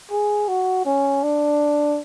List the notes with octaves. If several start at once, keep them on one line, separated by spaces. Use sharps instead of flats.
G#4
F#4
C#4
D4